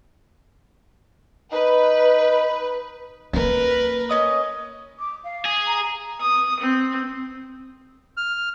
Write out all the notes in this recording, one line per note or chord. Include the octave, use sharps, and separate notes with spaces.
D#4 B4
A#3 D#4 A#4 B4
C#4 D#5 D#6
D6
F5
G#4
A#5
D#6
C4
F6